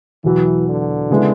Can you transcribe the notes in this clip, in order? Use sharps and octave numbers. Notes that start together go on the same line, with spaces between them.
E2 B2 E3 F#3
D3
C#3 G#3 B3 E4